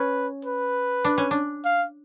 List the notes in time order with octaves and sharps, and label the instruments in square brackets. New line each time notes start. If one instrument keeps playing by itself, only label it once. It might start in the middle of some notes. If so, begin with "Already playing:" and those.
Already playing: [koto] C#4 [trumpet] B4
[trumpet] B4
[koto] D4
C#4
D4
[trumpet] F5